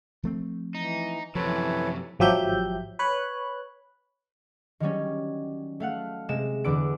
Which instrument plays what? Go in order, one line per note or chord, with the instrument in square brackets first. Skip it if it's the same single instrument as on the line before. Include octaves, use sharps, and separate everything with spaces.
[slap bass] F3 A3 C4
[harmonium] E3 [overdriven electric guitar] D#4
[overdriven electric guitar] F#2 C3 [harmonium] E3 [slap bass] F3 [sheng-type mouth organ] A4 B4 C#5
[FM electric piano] G#1 F3 F#3 G4 E5 G6
B4 C#5 F#6
[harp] D#3 F#3 G3 C#4
A3 F5 F#5
C3 G#3 E7
E2 D3 B4 D6 E6 D7